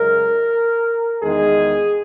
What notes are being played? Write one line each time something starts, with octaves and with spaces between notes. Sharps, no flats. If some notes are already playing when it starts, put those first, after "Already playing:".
Already playing: F#2 C#3 G#3 A#4
E2 D#3 G#3 G#4